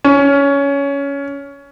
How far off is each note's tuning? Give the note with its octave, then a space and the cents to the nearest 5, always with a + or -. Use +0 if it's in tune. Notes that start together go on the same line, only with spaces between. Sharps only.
C#4 +15